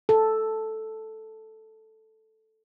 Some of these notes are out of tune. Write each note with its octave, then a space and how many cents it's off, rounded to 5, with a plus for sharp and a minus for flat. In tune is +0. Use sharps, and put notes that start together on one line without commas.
A4 +0